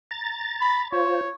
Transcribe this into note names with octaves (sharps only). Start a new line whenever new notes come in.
A#5 A6
B5
F4 C5 C#5